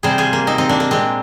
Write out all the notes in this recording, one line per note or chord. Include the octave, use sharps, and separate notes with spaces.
C3 G3 G#4 C5
F4 G#4
A#3
C4 D#4
C4 D#4
A#3 D4
A#3
A#2 G#3 C4